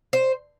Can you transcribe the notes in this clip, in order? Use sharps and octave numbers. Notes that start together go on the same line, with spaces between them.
C5